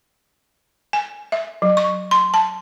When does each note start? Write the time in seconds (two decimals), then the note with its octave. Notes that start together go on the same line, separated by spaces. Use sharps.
0.93 G#5
1.32 E5
1.62 F#3
1.77 C#6
2.11 C6
2.34 A5